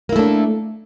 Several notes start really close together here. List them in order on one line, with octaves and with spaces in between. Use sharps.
A#3 E4 A3 D4